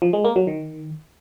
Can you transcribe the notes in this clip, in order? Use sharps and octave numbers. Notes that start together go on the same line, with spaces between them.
F3
G#3
A#3
F#3
D#3